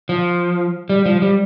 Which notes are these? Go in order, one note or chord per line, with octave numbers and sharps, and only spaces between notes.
F3
G3
F3
G3